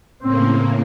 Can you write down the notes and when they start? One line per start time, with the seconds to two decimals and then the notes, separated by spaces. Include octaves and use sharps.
0.22 A2 C#3 A#3 C4